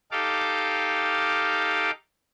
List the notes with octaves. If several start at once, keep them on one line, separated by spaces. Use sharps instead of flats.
D#4 G4 A4 F5 D6